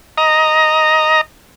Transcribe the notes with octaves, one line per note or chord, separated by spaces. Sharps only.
D#5 A#5